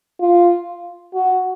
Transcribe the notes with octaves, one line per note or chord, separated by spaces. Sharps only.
F4
F#4